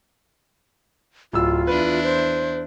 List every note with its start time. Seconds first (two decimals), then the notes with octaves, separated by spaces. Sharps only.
1.33 D1 F4 E6
1.67 E2 D4 E4 B4
2.03 C5